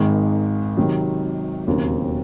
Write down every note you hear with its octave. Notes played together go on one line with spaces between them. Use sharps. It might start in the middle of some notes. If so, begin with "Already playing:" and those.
Already playing: G#1 G#2 D#3 G#3
C3 D#3 F#3
E1 D#2 C#3 F#3 C4